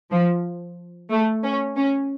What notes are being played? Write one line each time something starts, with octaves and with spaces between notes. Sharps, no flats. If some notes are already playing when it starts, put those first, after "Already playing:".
F3
A3
C#4
C#4